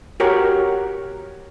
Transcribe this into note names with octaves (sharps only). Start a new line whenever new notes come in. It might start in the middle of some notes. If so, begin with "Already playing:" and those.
F#4 G4 A#4 C#5